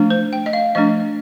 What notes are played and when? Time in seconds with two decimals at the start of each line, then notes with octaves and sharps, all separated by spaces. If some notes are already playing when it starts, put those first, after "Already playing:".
Already playing: F3 A3 D4
0.10 C5
0.33 G5
0.46 D#5
0.53 F5
0.75 F3 A3 D4 D#5